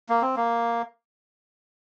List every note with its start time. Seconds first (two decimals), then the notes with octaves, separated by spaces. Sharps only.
0.09 A#3
0.22 C4
0.36 A#3